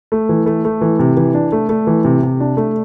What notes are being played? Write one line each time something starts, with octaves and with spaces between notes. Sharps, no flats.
A3
E3
A3
A3
E3
C3
E3
D4
A3
A3
E3
C3
C3
D4
A3